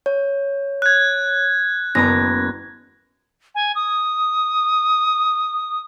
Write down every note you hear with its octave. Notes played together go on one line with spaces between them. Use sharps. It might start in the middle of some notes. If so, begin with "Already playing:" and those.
C#5
F#6 G#6
F#1 B3 A#5 A#6
G#5
D#6